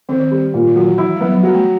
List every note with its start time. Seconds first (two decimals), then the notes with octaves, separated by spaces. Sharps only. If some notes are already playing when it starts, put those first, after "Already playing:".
0.09 D#3 C4
0.20 D#3
0.31 G3
0.54 A#2
0.67 D#3
0.75 E3 F#3
0.98 E3 E4
1.16 G3
1.21 F#3 B3
1.32 F#3
1.43 F#3 G3
1.54 A3